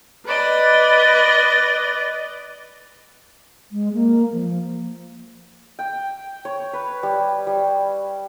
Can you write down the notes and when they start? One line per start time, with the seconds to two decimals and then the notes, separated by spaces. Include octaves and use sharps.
0.25 B4 D5 D#5
3.72 G#3
3.93 A#3
4.32 F3
5.79 G5
6.45 C#5
6.73 B4
7.03 G3
7.47 G3